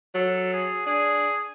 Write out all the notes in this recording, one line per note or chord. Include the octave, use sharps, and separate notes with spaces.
F#3 A4
G#4
D4 G#4